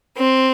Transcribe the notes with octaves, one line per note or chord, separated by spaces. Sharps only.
C4